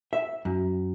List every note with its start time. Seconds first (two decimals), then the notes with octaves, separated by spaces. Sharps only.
0.13 E5
0.45 F#2